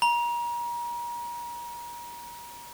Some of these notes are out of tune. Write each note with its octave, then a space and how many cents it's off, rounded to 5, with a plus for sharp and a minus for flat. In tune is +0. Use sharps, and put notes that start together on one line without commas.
A#5 +35